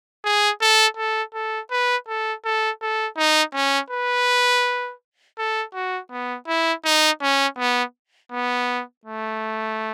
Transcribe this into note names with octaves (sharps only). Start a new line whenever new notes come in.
G#4
A4
A4
A4
B4
A4
A4
A4
D#4
C#4
B4
A4
F#4
B3
E4
D#4
C#4
B3
B3
A3